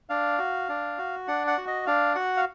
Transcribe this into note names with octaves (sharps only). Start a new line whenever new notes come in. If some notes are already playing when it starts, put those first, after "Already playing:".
D4 F5
F#4
D4
F#4
D4 F#5
F#5
F#4
D#5
D4 F5
F#4 F#5
F5